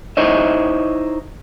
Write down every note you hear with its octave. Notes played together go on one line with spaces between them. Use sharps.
D#4 E4 C5 C#5 D#5 E5